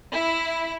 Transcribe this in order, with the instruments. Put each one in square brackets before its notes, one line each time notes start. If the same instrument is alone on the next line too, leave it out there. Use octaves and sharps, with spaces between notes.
[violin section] E4